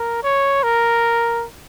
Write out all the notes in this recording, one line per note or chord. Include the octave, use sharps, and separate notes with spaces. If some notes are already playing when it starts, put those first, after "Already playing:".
Already playing: A#4
C#5
A#4